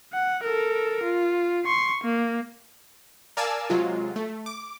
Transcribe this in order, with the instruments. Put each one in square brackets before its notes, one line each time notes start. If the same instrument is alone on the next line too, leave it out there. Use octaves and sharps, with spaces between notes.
[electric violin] F#5
A4 A#4
F4
C6 C#6
A#3
[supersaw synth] A#4 D5 F5 G#5 A5 E6
C3 F#3 G#3 F4
A3
D6